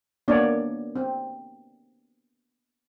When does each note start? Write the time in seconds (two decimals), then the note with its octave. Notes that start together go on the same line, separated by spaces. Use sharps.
0.28 A#3 B3 D4 C#5 D5
0.96 C4